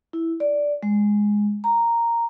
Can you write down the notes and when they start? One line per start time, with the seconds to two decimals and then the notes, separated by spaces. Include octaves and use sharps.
0.13 E4
0.40 D5
0.83 G#3
1.64 A#5